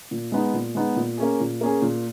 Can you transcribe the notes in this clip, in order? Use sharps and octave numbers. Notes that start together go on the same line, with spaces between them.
A#2
G#3 B3 D#4
A#2
G#3 B3 D#4
A#2
A#3 C#4 G#4
A#2
A#3 C#4 G#4
A#2